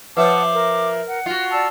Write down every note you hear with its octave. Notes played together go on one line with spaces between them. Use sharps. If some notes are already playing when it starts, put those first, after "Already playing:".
F3 B4 C#5 E5 F#5 A5 D6 D#6
A#4
F#5
F4 F#4
D5 A5 E6